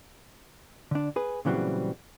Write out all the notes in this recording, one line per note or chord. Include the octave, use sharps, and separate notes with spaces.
D3 D4
G#4 B4
A#2 C#3 E3 F#3 G3 C4